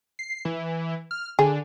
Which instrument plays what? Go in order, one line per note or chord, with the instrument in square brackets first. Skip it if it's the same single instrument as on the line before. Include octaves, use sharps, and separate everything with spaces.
[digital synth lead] C7
E3
F6
[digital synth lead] D3 [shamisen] G#4